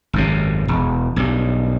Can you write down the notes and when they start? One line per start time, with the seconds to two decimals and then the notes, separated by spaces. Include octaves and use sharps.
0.13 G#1 F#2 C3
0.68 E1
1.16 B1 G2